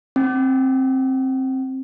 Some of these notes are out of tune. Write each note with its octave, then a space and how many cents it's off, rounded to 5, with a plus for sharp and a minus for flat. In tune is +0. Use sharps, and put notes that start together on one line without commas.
C4 +15